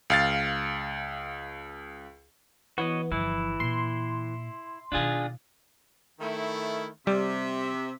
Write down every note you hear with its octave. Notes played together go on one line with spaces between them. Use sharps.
C#2 F5 A6
E3 B3 F#4 C#5 D#5
G1 E3 F3 E4
A#2 C6
B2 D#3 D4 F4 G#4
D#3 A3 E4
C3 G3 E5